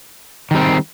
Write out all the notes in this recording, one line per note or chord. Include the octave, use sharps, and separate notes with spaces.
D#3 G3 C4